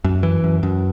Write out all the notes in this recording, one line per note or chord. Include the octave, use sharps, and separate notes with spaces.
F#2
E3
F#2
F#2